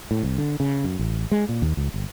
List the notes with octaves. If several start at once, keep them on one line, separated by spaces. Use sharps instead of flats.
A2
C2
D3
C#3
F#2
A1
G#3
A#2
D#2
C#2
G1